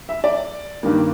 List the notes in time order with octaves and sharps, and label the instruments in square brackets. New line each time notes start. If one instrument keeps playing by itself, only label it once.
[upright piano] E5
D5
G2 D#3 G3 A#3